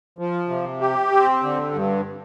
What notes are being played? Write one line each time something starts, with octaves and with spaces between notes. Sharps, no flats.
F3
C3
G4
C4
D3
G2